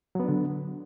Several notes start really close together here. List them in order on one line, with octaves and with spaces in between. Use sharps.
F#3 B3 D4 D3